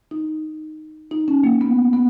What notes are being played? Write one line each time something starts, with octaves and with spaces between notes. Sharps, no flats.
D#4
D#4
C#4
A#3
B3
B3